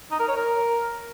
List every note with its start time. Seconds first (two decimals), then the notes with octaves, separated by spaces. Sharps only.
0.11 D#4
0.20 A#4
0.28 C#5
0.36 A#4